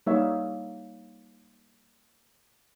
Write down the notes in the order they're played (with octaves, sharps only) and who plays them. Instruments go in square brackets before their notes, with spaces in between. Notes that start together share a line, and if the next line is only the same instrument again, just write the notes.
[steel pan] G3 A#3 D#4 C#5 E5